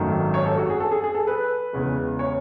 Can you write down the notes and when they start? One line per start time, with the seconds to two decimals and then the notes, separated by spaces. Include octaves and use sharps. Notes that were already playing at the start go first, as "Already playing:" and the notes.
Already playing: G#1 F#2 D#3 F#3 A3
0.34 C#5
0.46 A4
0.58 F#4
0.70 G#4
0.80 A4
0.91 G#4
1.04 G#4
1.15 A4
1.27 B4
1.73 E2 C#3 G#3
2.19 C#5